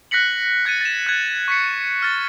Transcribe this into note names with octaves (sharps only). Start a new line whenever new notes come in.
F#6 A#6 B6 C#7 F#7
F#6 G#6 A6 C#7 D#7
A6 E7
F#6 G#6
C#6 B6 C#7
F6 A6